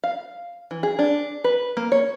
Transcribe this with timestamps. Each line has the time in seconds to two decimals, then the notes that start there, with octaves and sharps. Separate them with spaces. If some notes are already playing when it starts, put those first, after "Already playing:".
0.04 F5
0.71 E3
0.83 G#4
0.99 D4
1.44 B4
1.77 A#3
1.92 C#5